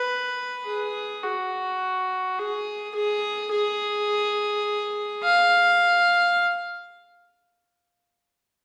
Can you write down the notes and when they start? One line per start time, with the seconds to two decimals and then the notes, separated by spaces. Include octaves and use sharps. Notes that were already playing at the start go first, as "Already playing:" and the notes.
Already playing: B4
0.67 G#4
1.23 F#4
2.38 G#4
2.95 G#4
3.52 G#4
5.24 F5